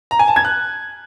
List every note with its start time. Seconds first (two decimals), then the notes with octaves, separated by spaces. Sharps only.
0.11 A#5
0.19 G#5
0.28 A5
0.36 G#6
0.45 F#6